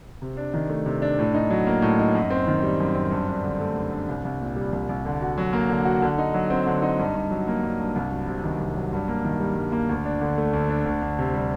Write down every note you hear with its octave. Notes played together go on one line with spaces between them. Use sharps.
C3
D4
D#3
A3
C3
D4
A2
D#4
F#3
A#3
A2
D#4
F#2
C4
D#3
G3
F#2
C4
G2
D4
D3
A3
G2
D4
C2
C2
A#2
G3
C2
C2
D3
F#4
F#3
A#3
D3
F#4
D3
D#4
F#3
C4
D3
D#4
G2
G2
F#3
A#3
G2
G2
C2
F#3
C3
D#3
C2
F#3
G2
A#3
D#3
G3
G2
A#3
D2
D4
D3
A3
D2
D4
D2
D2
C3
G3